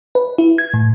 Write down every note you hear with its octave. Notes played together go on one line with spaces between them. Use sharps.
B4
E4
G#6
A2